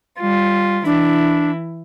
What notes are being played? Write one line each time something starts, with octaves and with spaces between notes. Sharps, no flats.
G3 F4
E3 D4 E4